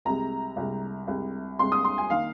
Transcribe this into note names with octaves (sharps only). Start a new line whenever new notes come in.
C2 C3 G#3 A#5
C2 C3 G#3
C2 C3 G#3
C2 C3 G#3 C6
D#6
C6
G#5
D#3 A#3 F5